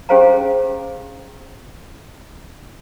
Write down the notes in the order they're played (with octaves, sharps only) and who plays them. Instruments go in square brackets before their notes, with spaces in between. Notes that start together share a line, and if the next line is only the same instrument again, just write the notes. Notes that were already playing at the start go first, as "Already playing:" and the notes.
[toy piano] C#4 G4 G#4 C5 F5 A#5